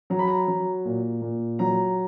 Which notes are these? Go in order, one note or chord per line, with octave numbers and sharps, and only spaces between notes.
F#3 A#5
B5
A#5
F#3
A#2
A#2
F#3 A#5